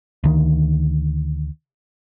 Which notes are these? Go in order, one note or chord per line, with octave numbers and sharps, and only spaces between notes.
D2 D#3